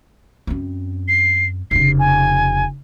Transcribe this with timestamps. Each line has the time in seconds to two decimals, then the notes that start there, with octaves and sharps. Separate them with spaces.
0.47 F#2 C4
1.08 C7
1.71 F1 C#3 C7
1.99 G#5